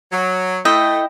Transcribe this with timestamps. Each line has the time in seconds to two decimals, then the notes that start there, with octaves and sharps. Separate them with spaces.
0.12 F#3
0.65 A3 E4 D#5 G5